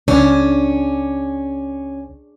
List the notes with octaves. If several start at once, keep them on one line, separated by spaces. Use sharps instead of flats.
C#2 C#4 D4 G#4